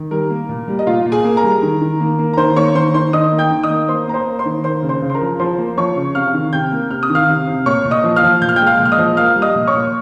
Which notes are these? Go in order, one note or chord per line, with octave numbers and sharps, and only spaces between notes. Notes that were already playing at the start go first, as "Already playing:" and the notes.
Already playing: D#3
G3 A#4
A#3
A#2
G3
D#5
A#2 F4 F5
A#2
G#4 G#5
A#3
A#4 A#5
G3
D#3
D#3
A#3
A#3
A#5
D#3 C5 C6
A#3 C#5 C#6
D#3 C5 C6
D#3 C5 C6
D#3 D#5 D#6
A#3
G5 G6
D#3
D#5 D#6
A#3
A#3 C5 C6
A#3 A#5
C5 C6
A#3
C5 C6
D#3
A#3 C5 C6
C#3
C5 C6
C#3
C6
A#4 A#5
F3
F3 C5 C6
A#3
F3 C#5 C#6
C#3
C3 F5 F6
D#3
C3 G5 G6
A#3
C3 F6
D#6
D#3
F5 F6
C3
C3
A#2 C#5 C#6
A#2
D#5 D#6
F3
F5 F6
F3
A#2 G6
F6
G#3 G5 G6
F5 F6
A#2
F6
D#5 D#6
F3
A#3 F5 F6
G3
D#5 D#6
A#2
C#5 C#6
A#2